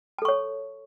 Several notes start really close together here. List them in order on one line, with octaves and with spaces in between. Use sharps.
A5 A4 C#6 C#5